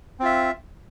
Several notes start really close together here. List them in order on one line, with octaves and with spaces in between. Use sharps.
C4 F4 E5